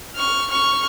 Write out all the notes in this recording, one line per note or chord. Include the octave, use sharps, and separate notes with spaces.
C#6 F6
C#6 F6